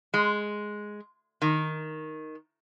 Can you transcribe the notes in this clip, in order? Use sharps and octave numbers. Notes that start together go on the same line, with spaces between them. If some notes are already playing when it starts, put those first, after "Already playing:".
G#3
D#3